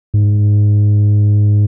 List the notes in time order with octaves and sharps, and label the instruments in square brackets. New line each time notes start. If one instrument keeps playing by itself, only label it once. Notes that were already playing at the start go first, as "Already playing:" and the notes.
[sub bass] G#2